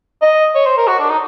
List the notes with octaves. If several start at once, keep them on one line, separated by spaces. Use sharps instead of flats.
D#5
C#5
C5
A#4
F#4
D4
D#4